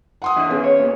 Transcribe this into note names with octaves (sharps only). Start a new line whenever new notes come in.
F#5 C6 D#6
E3 D4
B3 C#4 G#4
C#5
A#2 C#3